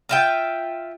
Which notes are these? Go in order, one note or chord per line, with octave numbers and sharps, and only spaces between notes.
F4 E5 G5